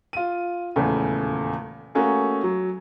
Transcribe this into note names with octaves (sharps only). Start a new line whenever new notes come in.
F4 D#7
D#1 E2 C#3 A3
A3 A#3 C#4 F#4 G#4
F#3